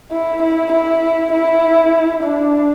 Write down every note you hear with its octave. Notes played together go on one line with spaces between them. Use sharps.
E4
E4
E4
E4
D4